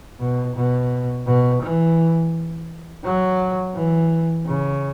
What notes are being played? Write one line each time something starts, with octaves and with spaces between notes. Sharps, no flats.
B2
B2
B2
E3
F#3
E3
C#3